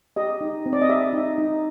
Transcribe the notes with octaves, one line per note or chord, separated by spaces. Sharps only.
G4 D#5
D#4
C4
D5
D#5
G4 E5
D#4
D#4